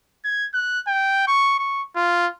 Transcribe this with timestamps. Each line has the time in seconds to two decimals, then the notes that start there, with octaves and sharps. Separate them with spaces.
0.25 G#6
0.54 F#6
0.87 G5
1.27 C#6
1.59 C#6
1.96 F4